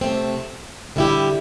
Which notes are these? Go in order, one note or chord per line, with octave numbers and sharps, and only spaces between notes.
C3 A3 C4
D3 G3 E4 G4